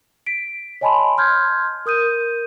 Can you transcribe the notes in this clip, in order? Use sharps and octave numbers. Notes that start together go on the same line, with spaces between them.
B6 D7
C#5 D#5 G#5 A5 B5 C6
C6 F6 G6 G#6
A#4 D#6 G6 D#7